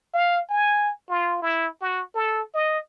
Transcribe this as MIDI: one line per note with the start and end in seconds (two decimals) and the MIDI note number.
0.14 0.40 77
0.49 0.91 80
1.09 1.38 65
1.42 1.68 64
1.81 2.02 66
2.15 2.42 69
2.54 2.78 75